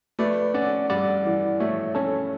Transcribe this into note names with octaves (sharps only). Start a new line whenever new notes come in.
A3 B4 D5
C#4 D5 F#5
G2 D5 F#5
E3
A3 C#5 E5
C#4 A4 C#5